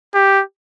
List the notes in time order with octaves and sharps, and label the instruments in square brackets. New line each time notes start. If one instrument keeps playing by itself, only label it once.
[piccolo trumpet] G4